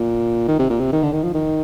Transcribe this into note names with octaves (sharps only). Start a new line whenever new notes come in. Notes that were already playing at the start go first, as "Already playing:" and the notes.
Already playing: A#2
D#3
C3
A#2
C3
D#3
D3
D#3
F3
D#3